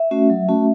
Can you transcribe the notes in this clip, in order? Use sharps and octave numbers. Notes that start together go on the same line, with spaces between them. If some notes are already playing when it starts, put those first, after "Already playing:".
Already playing: E5
A3 C#4 F#4
F#3
A3 C#4 F#4